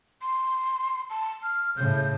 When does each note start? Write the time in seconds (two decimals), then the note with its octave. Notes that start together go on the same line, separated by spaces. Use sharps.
0.22 C6
1.10 A5
1.43 F6
1.77 A2 C#3 G6